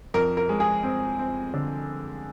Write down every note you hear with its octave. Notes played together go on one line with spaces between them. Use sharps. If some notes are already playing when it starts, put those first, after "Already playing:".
F2 A#4
A#4
G#3
G#4
C4
C4
D3